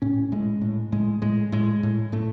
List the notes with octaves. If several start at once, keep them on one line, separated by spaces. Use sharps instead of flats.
A2 C#4
A2 G#3
A2
A2 G#3
A2 G#3
A2 G#3
A2
A2 A3